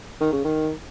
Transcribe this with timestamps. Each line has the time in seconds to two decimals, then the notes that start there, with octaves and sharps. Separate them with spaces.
0.20 D#3
0.32 C#3
0.44 D#3